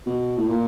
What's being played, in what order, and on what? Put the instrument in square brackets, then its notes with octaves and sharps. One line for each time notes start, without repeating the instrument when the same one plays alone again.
[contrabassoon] B2
A2
A#2